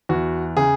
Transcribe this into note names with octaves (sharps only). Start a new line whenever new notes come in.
E2 F#4
C#3 G#4